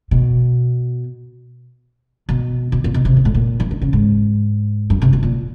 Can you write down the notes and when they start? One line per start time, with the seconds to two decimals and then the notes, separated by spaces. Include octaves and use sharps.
0.11 B2
2.29 B2
2.72 B2
2.84 A#2
2.94 B2
3.05 C3
3.17 A#2
3.25 A2
3.35 A#2
3.60 E3
3.71 D3
3.82 C#3
3.93 G#2
4.90 G2
5.02 C3
5.13 B2
5.23 A#2